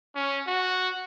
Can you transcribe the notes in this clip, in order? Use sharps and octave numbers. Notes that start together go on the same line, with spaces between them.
C#4
F#4